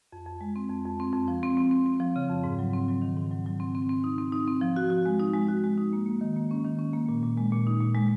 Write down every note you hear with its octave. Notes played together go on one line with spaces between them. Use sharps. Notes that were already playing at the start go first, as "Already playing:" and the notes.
F2
F2
G#3
C4
F2
F2
C4
F2
F3
C4
C4
C4
C4
F3
C#3
F2
G#2
F#3
C4
F#3
D#3
G#2
F#3
F#3
C4
C4
C4
D#4
C4
D#4
C4
F3
F#4
F#4
G#3
D#4
G#3
F#4
G#3
D#4
A#3
A#3
D#3
A#3
C#4
D#3
C#4
A#3
A#2
A#2
G#3
A#2
D#4
A#2
G#3